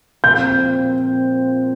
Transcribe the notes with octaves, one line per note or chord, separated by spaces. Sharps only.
A#2 F3 C4 F4 G6